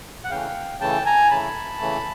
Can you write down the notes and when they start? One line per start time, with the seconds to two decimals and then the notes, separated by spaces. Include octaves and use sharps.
0.24 F#5
0.30 C#3 E3 A3 F5 G5
0.80 C#3 E3 A3 G5 A5
1.05 G#5 A#5
1.31 C#3 E3 A3 A5 B5
1.80 C#3 E3 A3